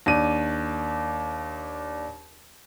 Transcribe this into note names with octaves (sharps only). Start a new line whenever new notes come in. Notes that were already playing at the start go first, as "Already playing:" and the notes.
D#2 D4 D#7